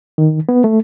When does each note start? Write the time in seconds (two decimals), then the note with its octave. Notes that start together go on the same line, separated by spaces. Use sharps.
0.18 D#3
0.49 B3
0.64 A3